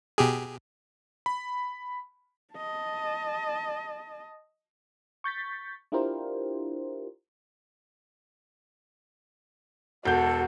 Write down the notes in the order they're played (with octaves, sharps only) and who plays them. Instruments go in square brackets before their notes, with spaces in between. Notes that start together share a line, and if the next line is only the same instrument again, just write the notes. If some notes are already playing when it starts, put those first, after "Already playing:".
[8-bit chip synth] B2 G4 G#4
[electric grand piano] B5
[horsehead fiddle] D#5 A5
[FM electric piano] C#6 G6 A6 B6
D4 E4 F4 G4 A#4 C5
[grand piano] E1 G6 [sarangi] F#4 [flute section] A4